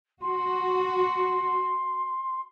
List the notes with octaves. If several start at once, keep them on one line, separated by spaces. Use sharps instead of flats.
F#4 C6